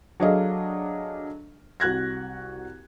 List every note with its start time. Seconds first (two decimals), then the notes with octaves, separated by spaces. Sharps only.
0.20 F#3 D4 G#4 A4 D#5 F5
1.80 C2 F#4 F#6 G#6 A#6